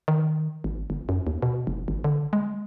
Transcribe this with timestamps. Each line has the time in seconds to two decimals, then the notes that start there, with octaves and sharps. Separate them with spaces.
0.08 D#3
0.64 G#1
0.90 G1
1.09 F#2
1.27 D#2
1.42 B2
1.67 F#1
1.88 G#1
2.04 D3
2.33 G#3